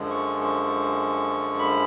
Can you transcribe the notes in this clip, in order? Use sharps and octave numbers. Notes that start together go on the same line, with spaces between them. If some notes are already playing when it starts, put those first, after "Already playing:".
Already playing: F#2 D3 F3 G#3
C#6
C#6
B5